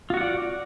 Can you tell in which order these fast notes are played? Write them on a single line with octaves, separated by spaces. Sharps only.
F4 F#4 F#5 D5